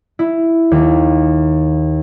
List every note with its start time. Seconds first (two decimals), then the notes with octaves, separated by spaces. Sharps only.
0.19 E4
0.71 D#2